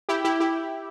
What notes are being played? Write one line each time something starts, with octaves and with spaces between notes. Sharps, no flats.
E4 G4
E4 G4
E4 G4